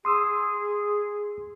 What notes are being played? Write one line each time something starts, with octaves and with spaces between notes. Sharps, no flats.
G#4 C6 D#6 E6